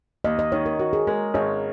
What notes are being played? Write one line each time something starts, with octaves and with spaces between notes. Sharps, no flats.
D#2 D#5
D#5
D#3 C#5
A#4
F#4 A#4
G#4
G#3 A#4
G#1 C#5